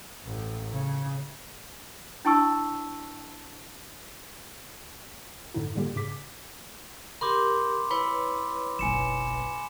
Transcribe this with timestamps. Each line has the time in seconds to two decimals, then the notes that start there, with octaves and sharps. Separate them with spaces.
0.25 A1
0.73 C#3
2.25 D4 E4 G5 A5 C#6 E6
5.54 F#2 A2 D3 D#4 E4
5.75 A2 D3 G3 A#3 F4 G4
5.96 G#2 C#3 D6 B6
7.21 G4 A#4 B5 C6 D6
7.91 E4 B4 C#5 B5
8.79 F#1 B1 G#5 C#7 E7